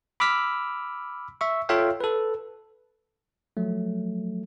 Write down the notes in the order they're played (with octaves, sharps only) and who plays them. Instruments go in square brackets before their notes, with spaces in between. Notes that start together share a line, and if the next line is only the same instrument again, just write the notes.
[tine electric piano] B5 D6 E6 F6 B6
E5 C#6
F4 A4 C#5 E5 F5 G5
A4 B4
F3 F#3 A3